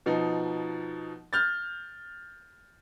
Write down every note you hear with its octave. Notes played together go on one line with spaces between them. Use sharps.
B2 F3 D#4
F6 G6 A6